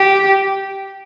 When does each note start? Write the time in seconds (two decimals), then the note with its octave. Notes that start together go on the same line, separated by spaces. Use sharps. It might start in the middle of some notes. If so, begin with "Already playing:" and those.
Already playing: G4